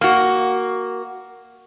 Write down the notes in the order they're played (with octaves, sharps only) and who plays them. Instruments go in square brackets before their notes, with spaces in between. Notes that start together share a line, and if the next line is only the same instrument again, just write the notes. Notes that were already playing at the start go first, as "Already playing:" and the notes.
[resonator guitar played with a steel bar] A#3 F#4